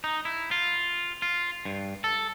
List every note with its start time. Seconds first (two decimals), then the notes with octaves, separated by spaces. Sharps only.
0.04 D#4
0.25 E4
0.51 F4
1.22 F4
1.65 G2
2.04 A4